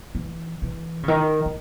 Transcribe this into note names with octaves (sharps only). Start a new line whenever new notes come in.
E3
E3
C#3
D#3
D#3